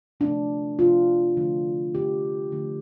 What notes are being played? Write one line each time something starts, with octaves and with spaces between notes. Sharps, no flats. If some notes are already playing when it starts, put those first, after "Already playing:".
C3 F3 A3 D4
C3 F3 A3 F4
D3 F3 A3
D3 F3 A3 G4
D3 F3 A3